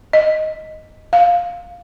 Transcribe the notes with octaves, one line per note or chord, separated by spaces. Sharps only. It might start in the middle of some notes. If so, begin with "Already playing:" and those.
D#5
F5